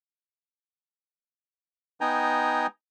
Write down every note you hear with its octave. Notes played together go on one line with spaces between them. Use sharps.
B3 D#4 G5 G#5 A#5